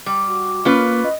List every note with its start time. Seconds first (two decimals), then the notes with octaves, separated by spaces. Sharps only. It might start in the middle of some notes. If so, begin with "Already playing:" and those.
0.06 G3 D6
0.27 F#4
0.65 A#3 C#4 F4 B4
1.04 D#5